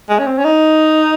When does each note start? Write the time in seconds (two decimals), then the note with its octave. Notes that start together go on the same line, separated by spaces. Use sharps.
0.09 G#3
0.19 C#4
0.27 C4
0.38 C#4
0.44 D#4